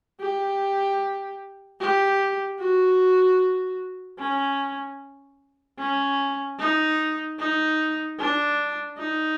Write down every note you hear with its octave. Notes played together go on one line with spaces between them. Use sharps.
G4
G4
F#4
C#4
C#4
D#4
D#4
D4
D#4